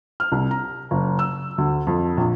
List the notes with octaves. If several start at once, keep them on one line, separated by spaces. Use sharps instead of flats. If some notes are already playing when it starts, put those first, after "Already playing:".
F6
C2
A#5
F#1
E6
D2
F2
A#1